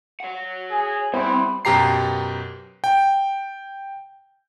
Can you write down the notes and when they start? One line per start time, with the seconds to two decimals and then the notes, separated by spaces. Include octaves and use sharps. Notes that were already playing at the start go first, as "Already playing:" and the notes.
0.20 C#5 F#5
0.70 G#4
1.13 G3 B3 C4 E4 C5
1.65 F#2 B2 G4 A#5 C7
2.84 G5